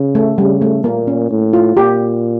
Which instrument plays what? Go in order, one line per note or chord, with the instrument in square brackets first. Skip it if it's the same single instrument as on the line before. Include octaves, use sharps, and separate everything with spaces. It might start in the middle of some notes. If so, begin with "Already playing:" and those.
Already playing: [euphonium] C#3
[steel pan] A3
[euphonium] C#3 [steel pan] G3
[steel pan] A3
[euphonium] A#2 [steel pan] A#3
[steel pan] C#4
[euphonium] A2
[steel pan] F4
[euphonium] A#2 [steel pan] G4